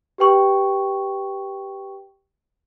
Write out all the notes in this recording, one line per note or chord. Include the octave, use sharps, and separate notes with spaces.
G4 B4 G5 C#6